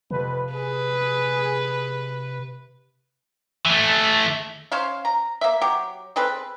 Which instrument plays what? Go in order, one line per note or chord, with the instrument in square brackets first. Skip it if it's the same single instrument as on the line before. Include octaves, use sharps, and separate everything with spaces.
[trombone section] F2 B4 [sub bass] C3
[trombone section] G#4 [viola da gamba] B4
[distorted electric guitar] E3 A3
[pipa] C#4 C5 C#5 F5
A#5
A#3 E5
F#3 G4
C4 G#4 A4 B4